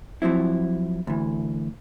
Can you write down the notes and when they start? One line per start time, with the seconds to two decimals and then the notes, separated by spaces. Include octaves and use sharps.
0.22 F3 F#3 C4 E4
1.07 D2 E3